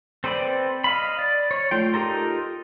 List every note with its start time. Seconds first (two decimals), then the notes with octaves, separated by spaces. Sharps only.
0.24 C4 A4 B4 D5
0.84 D#5 F5 B5
1.19 D5
1.51 C#5
1.71 A3 F4 G5
1.94 D#4 F4 G4 A4 A#4